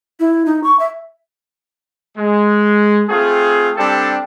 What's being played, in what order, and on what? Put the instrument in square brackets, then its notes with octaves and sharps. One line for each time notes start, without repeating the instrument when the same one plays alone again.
[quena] E4
D#4
C#6
E5
[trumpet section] G#3
A3 C4 F4 G#4
G3 C4 D4 G4 A4 A5